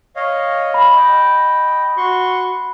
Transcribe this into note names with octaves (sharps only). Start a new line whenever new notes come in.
C#5 D#5 F5
B5
D#5 G5
F#4 C6 C#6